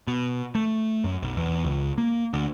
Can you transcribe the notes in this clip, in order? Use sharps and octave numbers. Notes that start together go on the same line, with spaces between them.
B2
A3
F#2
B1
E2
C#2
A#3
D2